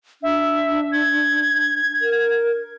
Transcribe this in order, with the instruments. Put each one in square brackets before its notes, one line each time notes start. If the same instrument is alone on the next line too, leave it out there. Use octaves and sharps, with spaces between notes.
[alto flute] D4 [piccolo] E5
[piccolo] G#6
[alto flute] A#4